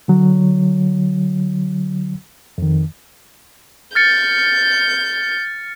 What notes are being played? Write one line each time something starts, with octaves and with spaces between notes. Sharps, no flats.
D3 F#3
F2 D#3
F6 G6 A6 C#7